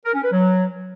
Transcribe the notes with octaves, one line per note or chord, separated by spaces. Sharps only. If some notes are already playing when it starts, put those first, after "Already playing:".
A#4
C#4
B4
F#3